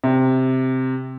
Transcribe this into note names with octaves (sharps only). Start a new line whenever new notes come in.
C3